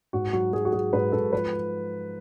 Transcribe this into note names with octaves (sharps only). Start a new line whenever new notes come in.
G#2 F#4
F#3 F#4
F#3 G#4
F#4
F#3 G#4
G#2 B4
G#2 A4
F3 B4